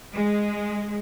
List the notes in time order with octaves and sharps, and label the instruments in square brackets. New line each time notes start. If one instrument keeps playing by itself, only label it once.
[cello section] G#3